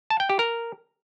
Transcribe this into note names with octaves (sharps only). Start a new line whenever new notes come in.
A5
G5
G4
A#4